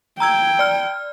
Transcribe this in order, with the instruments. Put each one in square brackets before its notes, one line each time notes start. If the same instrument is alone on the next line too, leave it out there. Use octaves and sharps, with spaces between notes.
[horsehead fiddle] G5 [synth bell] A#5 E6 G#6
[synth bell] D5 F6